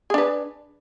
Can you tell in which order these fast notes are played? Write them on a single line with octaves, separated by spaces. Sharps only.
G#4 D4 B4